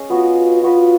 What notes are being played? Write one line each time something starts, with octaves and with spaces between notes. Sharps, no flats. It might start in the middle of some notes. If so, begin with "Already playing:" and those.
Already playing: C#4 G#4 D#5
B3 F4 F#4 B4
B3 F4 F#4 B4